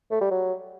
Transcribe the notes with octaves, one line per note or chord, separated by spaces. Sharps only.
A3
G3
F#3